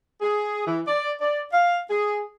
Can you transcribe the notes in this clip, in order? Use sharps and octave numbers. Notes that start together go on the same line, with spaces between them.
G#4
E3
D5
D5
F5
G#4